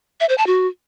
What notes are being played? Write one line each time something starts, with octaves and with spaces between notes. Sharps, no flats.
E5
C5
A5
F#4